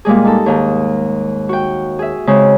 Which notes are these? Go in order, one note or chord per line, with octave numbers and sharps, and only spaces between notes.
A#2 G3 G#3 G#4
D#4 A4
D#2 G#2
F#4 G5
G#4 E5
C#3 G#3 C4 C#4 D#4